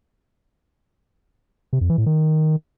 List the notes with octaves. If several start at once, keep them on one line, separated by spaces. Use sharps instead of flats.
C3
F2
E3
A2
D#3